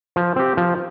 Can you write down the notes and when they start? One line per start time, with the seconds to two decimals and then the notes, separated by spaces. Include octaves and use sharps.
0.16 F3
0.36 C4 G4
0.57 F3